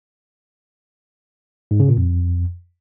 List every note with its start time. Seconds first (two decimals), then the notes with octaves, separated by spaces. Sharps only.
1.71 G#2
1.80 C#3
1.89 A#2
1.97 F2